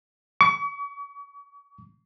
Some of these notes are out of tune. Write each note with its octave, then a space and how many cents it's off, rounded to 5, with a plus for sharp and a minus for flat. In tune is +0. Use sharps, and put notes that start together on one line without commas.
C#6 +45